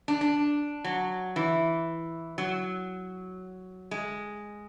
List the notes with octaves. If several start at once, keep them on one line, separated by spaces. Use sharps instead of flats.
D4
D4
F#3
E3
F#3
G#3